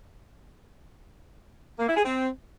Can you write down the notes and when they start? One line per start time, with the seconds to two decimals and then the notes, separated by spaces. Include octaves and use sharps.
1.79 A#3
1.87 E4
1.96 G#4
2.04 C4